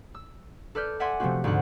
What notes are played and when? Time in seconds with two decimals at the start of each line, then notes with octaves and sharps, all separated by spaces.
0.14 E6
0.75 A4 B4 D5 F6 G6
1.00 D5 E5 F#5 G#5 C6
1.20 C3 F3 A3 B3 C4 F#4
1.44 D2 G#2 D3 F#5